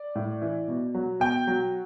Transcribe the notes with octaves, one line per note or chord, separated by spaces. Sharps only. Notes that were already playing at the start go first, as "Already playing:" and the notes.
Already playing: D5
A2
E3
B2
F#3
B2 G5
F#3